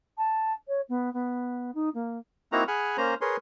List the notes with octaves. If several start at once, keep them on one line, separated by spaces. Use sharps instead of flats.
A5
C#5
B3
B3
D#4
A#3
A#3 C4 D#4 E4 F#4 A#5
G#4 F#5 G#5 B5 F6
A#3 C#4 C5 A#5
G#4 A#4 B4 C#5 C6